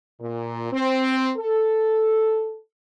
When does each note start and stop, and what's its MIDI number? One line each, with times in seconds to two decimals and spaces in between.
0.20 0.72 46
0.73 1.30 60
1.37 2.58 69